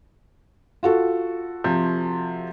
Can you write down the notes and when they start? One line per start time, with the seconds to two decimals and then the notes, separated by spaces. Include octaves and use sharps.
0.83 F4 F#4 A4
1.64 C3 F3